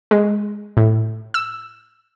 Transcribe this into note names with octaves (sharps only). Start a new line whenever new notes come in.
G#3
A2
E6